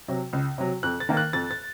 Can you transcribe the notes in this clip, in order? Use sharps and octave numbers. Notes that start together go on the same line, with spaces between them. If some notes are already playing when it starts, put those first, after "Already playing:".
C3 F#3
C#2
C3 F#3
F2 F#6
A6
D#3 A#3
F#6
F2 A6
A6